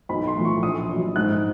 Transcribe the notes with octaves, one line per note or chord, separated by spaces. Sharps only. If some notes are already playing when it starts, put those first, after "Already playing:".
B1 B5
C6
A2 F3
C#6
A#1 D#6
A#2 F#3
G#2 F#6